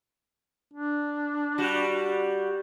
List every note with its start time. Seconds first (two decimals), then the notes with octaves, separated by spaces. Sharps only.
0.73 D4
1.58 G3 F#4